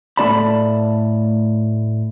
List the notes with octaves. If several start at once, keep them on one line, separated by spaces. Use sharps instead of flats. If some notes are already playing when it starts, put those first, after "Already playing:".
A2 A3 E4 D5 A5 B5